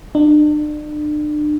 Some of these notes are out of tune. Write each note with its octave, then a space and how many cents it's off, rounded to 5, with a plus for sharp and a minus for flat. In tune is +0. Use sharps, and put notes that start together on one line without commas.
D4 +35